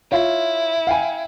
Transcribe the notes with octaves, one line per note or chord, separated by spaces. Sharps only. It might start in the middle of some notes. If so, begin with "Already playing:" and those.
E4 F4 C#5
F5 G5 G#5